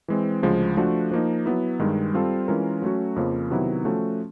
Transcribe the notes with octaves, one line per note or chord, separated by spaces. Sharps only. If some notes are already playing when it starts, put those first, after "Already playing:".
E3 G#3 C4
D2 C#3 F3 G#3
F3 A3 D4 F#4
F3 A#3 D#4
F#3 B3 E4
G2 D#3 G#3
G3 C4 F4 A4
E3 G#3 C#4 F4 A#4
F#3 A3 C#4 F#4
F2 C#3 F3 A#3
C3 D#3 F#3 B3 E4
F3 A3 C#4 F#4 A4